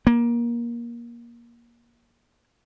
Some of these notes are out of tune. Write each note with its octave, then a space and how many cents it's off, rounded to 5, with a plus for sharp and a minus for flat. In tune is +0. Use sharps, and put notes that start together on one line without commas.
A#3 +20